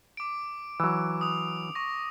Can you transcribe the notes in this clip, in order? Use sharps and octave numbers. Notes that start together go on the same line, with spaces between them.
D6 D7
E3 F#3
D#6 F7
C#6 A#6